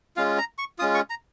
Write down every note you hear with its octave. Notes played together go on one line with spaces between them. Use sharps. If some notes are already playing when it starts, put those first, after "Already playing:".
G#3 C#4 F4 F5
A#5
C#6
G#3 C#4 F4 D#6
C#6
A#5